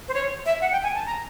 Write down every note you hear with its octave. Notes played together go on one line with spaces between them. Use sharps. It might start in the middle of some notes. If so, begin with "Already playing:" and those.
C5
C#5
E5
F#5
G5
G#5
A5
A#5